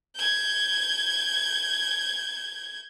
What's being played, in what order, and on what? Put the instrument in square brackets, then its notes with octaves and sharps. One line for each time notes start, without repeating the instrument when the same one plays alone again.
[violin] G6 G#6